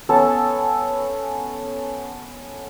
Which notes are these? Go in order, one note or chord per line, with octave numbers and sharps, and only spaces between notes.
B3 C#4 A4 A5